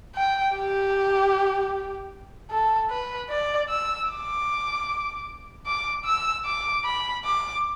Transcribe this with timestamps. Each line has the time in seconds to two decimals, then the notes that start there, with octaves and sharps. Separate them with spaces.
0.15 G5
0.55 G4
2.51 A4
2.90 B4
3.30 D5
3.69 E6
4.09 D6
5.66 D6
6.05 E6
6.45 D6
6.84 B5
7.24 D6